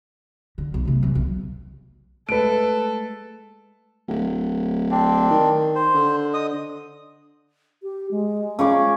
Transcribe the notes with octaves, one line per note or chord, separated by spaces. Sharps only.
D3
B1
C3 A3
G2 E3
B1
G#3 A3 A4 B4 D7
D1
C4 D4
D#3
C5
D3
D#5 D#6
G4
G#3
C#3 C#5 D6